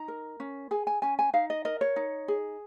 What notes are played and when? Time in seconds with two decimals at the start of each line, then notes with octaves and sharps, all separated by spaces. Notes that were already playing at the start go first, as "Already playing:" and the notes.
Already playing: D#4 A#5
0.08 A#4
0.40 C#4
0.71 G#4 G#5
0.87 G#5
1.02 C#4 G#5
1.19 G#5
1.33 D#4 F5
1.50 D#5
1.65 A#4 D#5
1.81 C#5
1.96 D#4
2.28 G#4